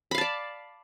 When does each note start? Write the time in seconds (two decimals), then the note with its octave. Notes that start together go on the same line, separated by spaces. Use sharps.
0.11 B5
0.15 F5
0.18 A5
0.21 D5